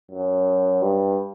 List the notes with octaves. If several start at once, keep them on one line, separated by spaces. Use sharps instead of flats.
F#2
G2